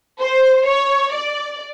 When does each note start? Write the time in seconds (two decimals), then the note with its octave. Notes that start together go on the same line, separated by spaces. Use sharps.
0.19 C5
0.66 C#5
1.12 D5